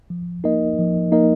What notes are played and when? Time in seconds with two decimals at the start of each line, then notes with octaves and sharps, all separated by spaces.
0.10 F3
0.44 A#3 D#4 A#4 D#5
0.79 F3
1.12 A#3 D#4 A#4 D#5